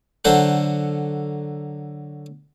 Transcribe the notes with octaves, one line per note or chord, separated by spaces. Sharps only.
D3 F#3 A4 C5 E5 F#5